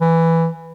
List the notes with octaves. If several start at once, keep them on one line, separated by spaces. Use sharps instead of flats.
E3